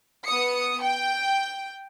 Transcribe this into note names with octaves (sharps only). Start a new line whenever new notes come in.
B3 D#6 C#7
G5